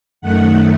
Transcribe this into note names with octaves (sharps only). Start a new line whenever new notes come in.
F#2 D#3 A3 F#5